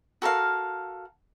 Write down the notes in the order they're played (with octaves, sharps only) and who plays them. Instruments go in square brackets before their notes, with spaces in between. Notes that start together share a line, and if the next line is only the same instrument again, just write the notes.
[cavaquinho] F#4 A4 A#4 F5